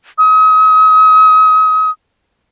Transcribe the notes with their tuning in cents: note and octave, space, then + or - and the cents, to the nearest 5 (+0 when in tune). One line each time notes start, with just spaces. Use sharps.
D#6 +35